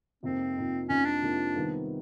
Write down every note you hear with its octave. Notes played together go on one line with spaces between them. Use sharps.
F2 C3 F3 A#3 C4 D#4
F2 C3 F3 A#3 D#4
F2 C3 F3 A#3 C#4 D#4
D4
F2 C3 F3 A#3 D#4
C3 D#3 G3 B3 D#4